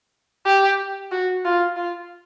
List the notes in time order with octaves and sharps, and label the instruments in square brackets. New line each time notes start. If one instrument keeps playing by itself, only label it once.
[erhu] G4
F#4
F4
F4